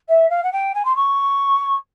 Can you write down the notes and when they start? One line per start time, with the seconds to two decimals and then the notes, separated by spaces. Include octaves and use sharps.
0.09 E5
0.30 F5
0.43 F#5
0.52 G5
0.74 G#5
0.85 C6
0.96 C#6